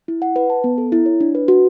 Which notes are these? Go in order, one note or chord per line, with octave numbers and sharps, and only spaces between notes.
E4
F#5
B4
A5
B3
A4
E4
C#5
D4
B4
F#4